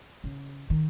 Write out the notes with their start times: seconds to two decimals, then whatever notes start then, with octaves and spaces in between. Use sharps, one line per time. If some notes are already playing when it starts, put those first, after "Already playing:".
0.24 C#3
0.70 D#3